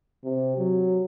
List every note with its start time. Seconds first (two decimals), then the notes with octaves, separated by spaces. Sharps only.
0.24 C3
0.58 F#3